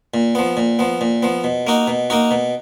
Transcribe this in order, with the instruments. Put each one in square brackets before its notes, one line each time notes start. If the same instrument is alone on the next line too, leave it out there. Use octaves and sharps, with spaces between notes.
[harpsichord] A#2
F3 B3
A#2
F3 B3
A#2
F3 B3
B2
A#3 D#4 F#4
B2
A#3 D#4 F#4
B2